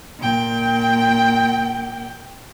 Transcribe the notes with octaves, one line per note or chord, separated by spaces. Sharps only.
A#2 G5